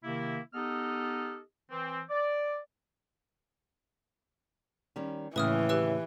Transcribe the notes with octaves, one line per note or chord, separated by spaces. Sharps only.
C3 D#3 A#3 E4
B3 D#4 G4 A4 D#5 F6
E3 C4
D5
D#3 G3 C#4
D#2 A2 C#3 E3 B4 D#6 F6
G4 B4 E6